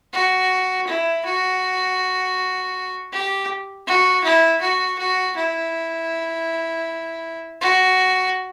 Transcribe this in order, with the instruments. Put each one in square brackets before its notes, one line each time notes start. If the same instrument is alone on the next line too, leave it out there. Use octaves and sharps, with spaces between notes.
[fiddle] F#4
E4
F#4
G4
F#4
E4
F#4
F#4
E4
F#4